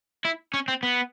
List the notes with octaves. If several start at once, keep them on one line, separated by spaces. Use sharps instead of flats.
E4
C#4
C4
B3